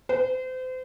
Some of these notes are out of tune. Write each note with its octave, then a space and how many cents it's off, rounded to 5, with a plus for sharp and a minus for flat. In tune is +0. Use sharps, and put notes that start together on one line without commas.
C5 -35